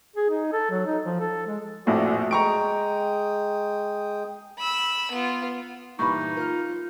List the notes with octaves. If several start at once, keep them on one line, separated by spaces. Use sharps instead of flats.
G#4
D#4
A4
F#3
D#4
F3
A4
G#3
A#1 F2 A2 F#4 D5 D#6
G#3 G5 A#5 C#6 D#6 D7
B5 E6
B3 F4
G2 A#2 E3 D#4 B5 C#6
F4 A#4 F6